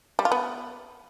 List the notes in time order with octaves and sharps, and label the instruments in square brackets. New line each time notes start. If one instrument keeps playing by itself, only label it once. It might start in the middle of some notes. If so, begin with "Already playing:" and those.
[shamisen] G3
F4
B3